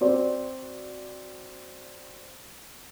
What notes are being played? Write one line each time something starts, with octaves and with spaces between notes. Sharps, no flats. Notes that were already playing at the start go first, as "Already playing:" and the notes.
C4 F#4 D5